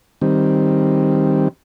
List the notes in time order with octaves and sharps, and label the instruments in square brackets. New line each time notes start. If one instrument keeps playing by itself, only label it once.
[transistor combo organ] D#3 G3 C4